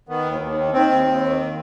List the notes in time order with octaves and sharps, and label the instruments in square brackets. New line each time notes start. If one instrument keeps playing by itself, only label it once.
[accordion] D#3 B3
D#2
D#2
D#3
D#3 C4
D#2
D#2
D#3